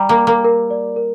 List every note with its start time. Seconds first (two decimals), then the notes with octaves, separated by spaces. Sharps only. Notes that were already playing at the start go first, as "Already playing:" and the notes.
Already playing: G3 G5 A#5
0.09 A#3
0.18 D6
0.27 A#3
0.44 A#4
0.71 D5
0.96 A#4